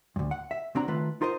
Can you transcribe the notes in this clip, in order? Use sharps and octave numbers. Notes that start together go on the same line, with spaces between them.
D2 G2
F#5
E5
C#3 C4 D4 F#4 A#5
D#3 A3 F4 B4
D#4 F4 A#4 C5 D#5